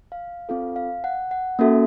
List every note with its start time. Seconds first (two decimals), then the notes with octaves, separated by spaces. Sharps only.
0.12 F5
0.49 C4 F4 A4 F5
0.76 F5
1.04 F#5
1.31 F#5
1.59 A#3 C#4 F#4 A4 E5